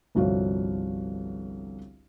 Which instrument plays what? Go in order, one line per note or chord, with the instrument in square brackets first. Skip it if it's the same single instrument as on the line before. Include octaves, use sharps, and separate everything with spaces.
[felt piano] G1 C2 F3 F#4 C#5 F5